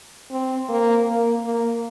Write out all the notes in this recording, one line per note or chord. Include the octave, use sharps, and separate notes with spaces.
C4
A#3
A#3
A#3